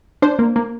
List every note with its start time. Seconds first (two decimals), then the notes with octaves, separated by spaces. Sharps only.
0.22 D4 C5
0.39 A#3
0.56 A#3